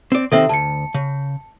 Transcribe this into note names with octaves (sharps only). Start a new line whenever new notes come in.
C4 D5
C3 D#3 C4 A4 E5
D2 A5 C#7
C#3